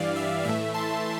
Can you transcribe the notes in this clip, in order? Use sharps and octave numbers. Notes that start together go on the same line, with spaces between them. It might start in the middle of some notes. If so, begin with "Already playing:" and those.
Already playing: G2 E3 G3 D5 F5
E5
A2 E3 A3 E5
A5 C6